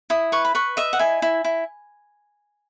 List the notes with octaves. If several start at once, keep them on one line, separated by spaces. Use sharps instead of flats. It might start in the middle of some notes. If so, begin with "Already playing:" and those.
E4 D#6
B4 C#6
B5
B4 C#6
D#5 E5
F#5
E4 G#5
E4
E4